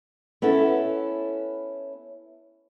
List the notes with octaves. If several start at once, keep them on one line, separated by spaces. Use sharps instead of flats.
B3 C#4 E4 A4